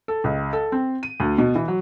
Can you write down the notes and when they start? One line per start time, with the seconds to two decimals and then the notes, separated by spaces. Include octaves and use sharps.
0.08 A4
0.24 C#2
0.53 A4
0.72 C4
1.03 D#7
1.20 D2
1.38 B2
1.55 E3
1.68 F#3